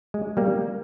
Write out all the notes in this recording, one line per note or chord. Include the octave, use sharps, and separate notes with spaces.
G#3
G3 A#3